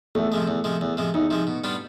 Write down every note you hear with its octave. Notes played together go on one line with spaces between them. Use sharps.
E2 A3
C3 F3 G#3
E2
C3 F3 G#3
E2
C3 F3 G#3
E2 D#4
C3 F3 G#3
B2
G3 B3 D4 F4